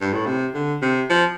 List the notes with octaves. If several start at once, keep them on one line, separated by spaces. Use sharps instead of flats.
G2
A2
C3
D3
C3
F3